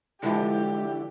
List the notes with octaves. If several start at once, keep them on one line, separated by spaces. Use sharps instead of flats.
D3 E3 F3 G#3 D4 E4 F#4 G4